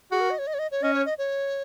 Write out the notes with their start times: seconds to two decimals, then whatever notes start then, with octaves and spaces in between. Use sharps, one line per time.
0.11 F#4 G#4
0.21 A#4
0.30 D#5
0.39 C#5
0.47 D#5
0.54 C#5
0.59 D#5
0.71 C#5
0.83 C#4 D#5
0.94 C#5
1.06 D#5
1.18 C#5